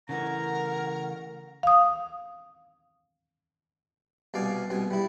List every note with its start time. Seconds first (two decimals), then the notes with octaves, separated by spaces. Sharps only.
0.09 C#3 E3 A3 A#4 F#5 A#5
1.63 F5 D#6
4.34 C2 B2 D5 F5 G#5
4.70 C2 B2 G#5
4.91 G3 E4